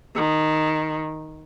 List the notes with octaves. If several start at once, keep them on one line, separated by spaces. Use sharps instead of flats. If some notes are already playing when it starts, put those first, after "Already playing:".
D#3